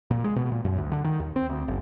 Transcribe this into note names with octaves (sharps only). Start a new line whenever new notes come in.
A#2
G#3
B2
A#2
F#2
D2
D3
D#3
D#2
C4
D2
F#1